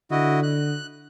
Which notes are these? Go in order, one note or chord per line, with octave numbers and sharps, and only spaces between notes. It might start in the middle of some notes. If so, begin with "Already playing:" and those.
D3 E4 F#4 D#5
F#6